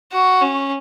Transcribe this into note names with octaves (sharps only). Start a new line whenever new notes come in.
F#4
C#4